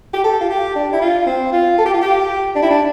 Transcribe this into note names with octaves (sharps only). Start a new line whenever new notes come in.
G4
A4
F4
G4
D4
E4
F4
C4
F4
A4
G4
F4
G4
D4
E4
D4